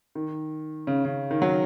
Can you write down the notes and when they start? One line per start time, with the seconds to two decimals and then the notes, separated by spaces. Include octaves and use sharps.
0.15 D#3
0.87 C#3
1.05 C#3
1.31 D#3
1.42 F#3